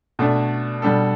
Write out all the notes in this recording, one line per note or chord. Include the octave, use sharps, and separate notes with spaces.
B2 A3 D4
B2 G3 D4 A4